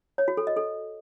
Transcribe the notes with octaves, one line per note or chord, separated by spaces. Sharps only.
C#5
F#4
A4
D#5
A4